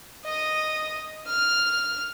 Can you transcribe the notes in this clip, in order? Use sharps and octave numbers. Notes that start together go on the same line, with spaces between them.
D#5 D#6
F6